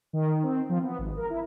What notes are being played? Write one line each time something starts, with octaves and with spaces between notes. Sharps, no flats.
D#3
C4
F3
B3
G#1
A#4
E4